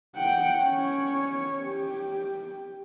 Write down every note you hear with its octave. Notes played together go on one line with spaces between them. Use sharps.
F#5 G5
C#4 C#5
G4